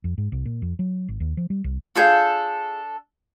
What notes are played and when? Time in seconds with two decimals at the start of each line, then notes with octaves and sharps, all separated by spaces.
0.04 F2
0.18 G#2
0.32 C2
0.46 A#2
0.62 F2
0.79 F#3
1.09 G#1
1.20 D#2
1.37 F3
1.50 G3
1.64 C2
1.96 D4 F4 G#4 A4 F5 G6